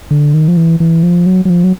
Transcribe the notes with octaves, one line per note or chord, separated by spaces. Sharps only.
D3
D#3
F3
E3
E3
F3
F#3
F#3
F3
F#3